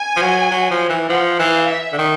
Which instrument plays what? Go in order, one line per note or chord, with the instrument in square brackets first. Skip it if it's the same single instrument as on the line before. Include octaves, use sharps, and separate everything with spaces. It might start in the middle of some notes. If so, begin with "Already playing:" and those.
Already playing: [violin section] G#5
[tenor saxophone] F3
F#3
F#3
F3
E3
[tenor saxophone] F3 [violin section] F#5
[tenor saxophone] E3 [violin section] F5
[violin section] E5
[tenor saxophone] D3
D#3